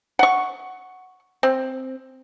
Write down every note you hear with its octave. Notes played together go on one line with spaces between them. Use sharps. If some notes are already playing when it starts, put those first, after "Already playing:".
F#5 C#6
C4